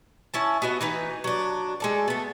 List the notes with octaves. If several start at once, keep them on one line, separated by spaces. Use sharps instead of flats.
C#4 E4 A5
B3 F#4 B4 D#5
E3 D#4 B4
F#3 D4
G#3 A4 D5
A3 B3